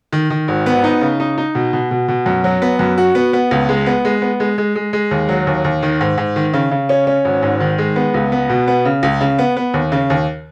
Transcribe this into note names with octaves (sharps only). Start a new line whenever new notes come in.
D#3
D#3
G#1
B3
D#4
C#3
D#4
D#4
B2
B2
B2
B2
F#2
F#3
B3
F#2
F#4
B3
B3
C#2
G#3
B3
G#3
B3
G#3
G#3
G#3
G#3
D#2
F#3
D#2
D#2
D#3
G#2
G#2
D#3
C#3
C#3
C#4
C#4
G#1
G#2
D#3
G#3
B3
C#2
B3
B2
B3
C#3
C#2
C#3
B3
B3
D#2
C#3
D#2